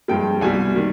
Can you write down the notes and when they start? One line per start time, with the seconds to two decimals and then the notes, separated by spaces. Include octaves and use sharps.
0.08 G2 F3 G#3 G5
0.41 C2 B2 G3 G#5
0.75 D#3 G3